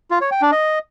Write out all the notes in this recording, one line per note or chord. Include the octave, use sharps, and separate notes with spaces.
F4
C#5
G5
D4
D#5